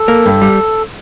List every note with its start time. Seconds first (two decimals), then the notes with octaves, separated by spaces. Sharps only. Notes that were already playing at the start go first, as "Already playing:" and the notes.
Already playing: A4
0.08 A#3
0.26 G2
0.42 G3